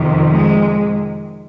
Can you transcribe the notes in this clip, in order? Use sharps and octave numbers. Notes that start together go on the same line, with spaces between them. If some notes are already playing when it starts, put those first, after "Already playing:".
Already playing: F2 C3 D#3
G#3